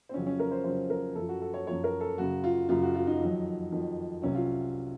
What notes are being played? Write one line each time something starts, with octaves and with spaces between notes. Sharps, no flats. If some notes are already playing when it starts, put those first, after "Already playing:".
C4
F2 C#3 F#3 C#4
C#4
A#4
C5
F2 C#3 F#3 C5
A#4
F#2 F3 A4
F#4
A4
C#5
F#2 F3 C#5
A#4
A4
F#2 C#3 F#3 F#4
F4
F#2 C#3 F#3 F4
F#4
F4
D#4
F2 D#3 F#3
F2 D#3 F#3
C2 C3 F#3 C#4
F4